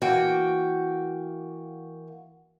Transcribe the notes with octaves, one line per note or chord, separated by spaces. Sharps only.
E3 A#3 F#4 G5